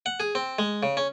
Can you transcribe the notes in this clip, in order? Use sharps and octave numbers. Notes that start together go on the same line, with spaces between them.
F#5
G#4
C4
G#3
C#3
C#4